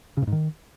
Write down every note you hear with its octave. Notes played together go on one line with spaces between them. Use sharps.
C#3
A2
G#2
D#3